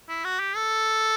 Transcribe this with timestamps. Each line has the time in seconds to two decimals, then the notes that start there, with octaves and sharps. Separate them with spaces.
0.09 E4
0.24 F#4
0.40 G4
0.56 A4